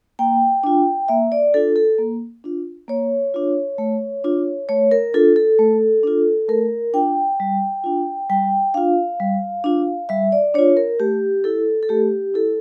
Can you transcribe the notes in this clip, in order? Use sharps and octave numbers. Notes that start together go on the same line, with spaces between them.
A#3 G5
D4 F4
A#3 E5
D5
D4 F4 A4
A4
A#3
D4 F4
A#3 C#5
D4 F4
A3
D4 F4
A3 C#5
A#4
D4 F4 A4
A4
A3
D4 F4
A3 A#4
D4 F4 G5
G3
D4 F4
G3 G5
D4 F4 F5
G3
D4 F4
G3 E5
D5
D4 F4 C#5
A#4
A3 G4
E4 A4
A4
A3 G4
E4 A4